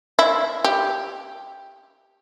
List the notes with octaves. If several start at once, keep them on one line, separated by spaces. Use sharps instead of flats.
E4
G4